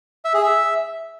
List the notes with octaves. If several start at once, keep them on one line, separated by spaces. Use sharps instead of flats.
E5
G#4
E5